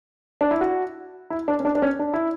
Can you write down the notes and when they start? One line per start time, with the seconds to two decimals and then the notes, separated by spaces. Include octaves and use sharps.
0.41 D4
0.51 E4
0.61 F#4
1.30 E4
1.48 D4
1.60 C#4
1.65 D4
1.75 D4
1.82 C#4
1.99 D4
2.13 E4